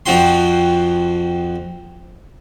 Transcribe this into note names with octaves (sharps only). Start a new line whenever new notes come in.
F2 F3 C4 F#4 G5 C6